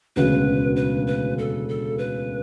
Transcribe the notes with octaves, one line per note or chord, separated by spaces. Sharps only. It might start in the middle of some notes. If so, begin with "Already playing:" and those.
E1 D2 C#3 B4
B4
B4
A4
A4
B4